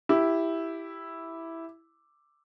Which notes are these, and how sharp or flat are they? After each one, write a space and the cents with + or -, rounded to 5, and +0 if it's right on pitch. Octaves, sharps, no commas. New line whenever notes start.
E4 +0 G4 +0